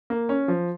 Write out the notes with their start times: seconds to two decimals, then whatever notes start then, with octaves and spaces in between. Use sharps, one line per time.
0.10 A#3
0.29 C#4
0.48 F3